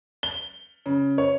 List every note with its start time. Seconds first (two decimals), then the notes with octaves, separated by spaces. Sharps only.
0.23 G7
0.86 C#3
1.18 C#5